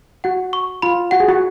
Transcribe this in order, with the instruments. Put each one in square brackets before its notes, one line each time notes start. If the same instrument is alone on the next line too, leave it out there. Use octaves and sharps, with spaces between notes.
[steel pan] F#4 [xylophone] F#5
[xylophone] C#6
[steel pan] F4 [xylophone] B5
[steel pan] F#4 [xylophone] F#5
[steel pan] G#4
F#4